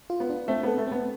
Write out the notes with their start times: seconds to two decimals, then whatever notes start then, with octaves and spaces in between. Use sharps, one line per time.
0.10 F4
0.20 B3
0.30 D4
0.48 A3 C4
0.63 B3 A4
0.78 A3
0.87 B3 C4